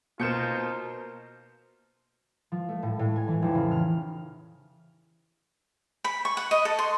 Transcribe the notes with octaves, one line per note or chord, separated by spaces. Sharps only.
B2 A#3 D#4 F4 C5 G6 C#7 E7
F3
A3
A2
A2
G#5
E3
F1
C#3
F6
B5
C#6
F#5
D#5
A4
C6